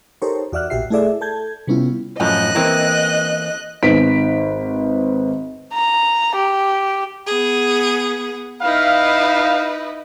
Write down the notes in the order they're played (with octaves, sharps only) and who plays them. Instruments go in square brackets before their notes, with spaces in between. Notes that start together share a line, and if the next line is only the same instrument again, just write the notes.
[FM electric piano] D#4 G4 A4 A#4 C5 C#5
E2 F#4 D5 E5 F6 F#6
A1 A#2 F#4 G4 E5 C7
A3 E4 G#4 A4 D5 E5
A4 A5 G6 G#6
C3 G3 B3 C#4 E4 F4
[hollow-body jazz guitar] F#2 A2 F3 [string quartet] D#5 F#6
[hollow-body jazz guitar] E3 A#3 C4
[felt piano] G#1 D#4 B4 B6 D7
[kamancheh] A#5
G4
[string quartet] B3 G#4
[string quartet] D#4 E4 B4 [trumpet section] F5